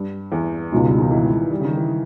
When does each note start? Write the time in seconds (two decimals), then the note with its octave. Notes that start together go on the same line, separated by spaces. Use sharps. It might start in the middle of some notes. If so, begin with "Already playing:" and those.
Already playing: G2
0.32 E2
0.72 C#2 B2 G#3 D#4
0.85 G2
0.98 D#3
1.11 E3
1.51 G3
1.60 C#3
1.65 D#3
1.77 E3